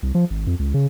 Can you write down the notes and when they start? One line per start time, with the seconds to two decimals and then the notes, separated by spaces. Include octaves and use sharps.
0.03 C2
0.15 F3
0.30 G#1
0.47 F2
0.59 C#2
0.74 C#3